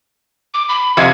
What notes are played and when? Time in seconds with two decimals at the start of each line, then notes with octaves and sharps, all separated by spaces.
0.54 D6
0.69 B5
0.97 F2 C3 G#6